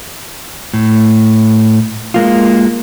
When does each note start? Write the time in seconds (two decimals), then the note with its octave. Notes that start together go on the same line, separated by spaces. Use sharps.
0.74 A2
2.14 G#3 A#3 F4